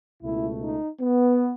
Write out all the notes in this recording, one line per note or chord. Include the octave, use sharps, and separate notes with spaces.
C#2 B2 A3 E4
D#4
B3